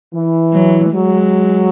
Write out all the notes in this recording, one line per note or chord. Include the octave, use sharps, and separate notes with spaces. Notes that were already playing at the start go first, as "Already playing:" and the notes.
E3
F#3
F#3 G#3